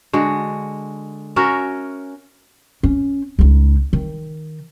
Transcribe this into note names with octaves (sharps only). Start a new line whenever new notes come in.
D3 G#3 F#4
C#4 F#4 A#4 E5
C#4
C#2 D#4
D#3